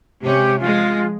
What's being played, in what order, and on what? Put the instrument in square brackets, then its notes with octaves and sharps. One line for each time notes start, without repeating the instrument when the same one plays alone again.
[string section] C3 G#3 C#4 [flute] G4
[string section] F3 G#3 [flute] F4